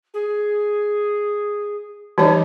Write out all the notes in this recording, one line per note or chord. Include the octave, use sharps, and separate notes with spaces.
G#4
E3 G3 D#4 C#5 A5